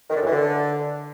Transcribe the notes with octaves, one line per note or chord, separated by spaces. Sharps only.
D#3
D3
F#2
E3
D3